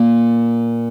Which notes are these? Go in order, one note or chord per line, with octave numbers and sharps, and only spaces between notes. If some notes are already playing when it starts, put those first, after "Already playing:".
Already playing: A#2